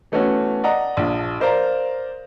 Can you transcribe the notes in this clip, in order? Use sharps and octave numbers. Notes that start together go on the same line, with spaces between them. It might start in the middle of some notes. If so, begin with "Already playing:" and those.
E3 A3 B3 C#4 F#4
D5 D#5 F#5 A#5
A#1 F3
A#4 C5 D5 F5 A#5